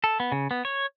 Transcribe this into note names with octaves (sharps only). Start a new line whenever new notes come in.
A4
B3
C#3
B3
C#5